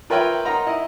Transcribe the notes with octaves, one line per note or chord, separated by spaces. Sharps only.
F4 A#4 B4 C#5 E5 G5
D#4 A#4 F#5 A#5 C6
E4 D#5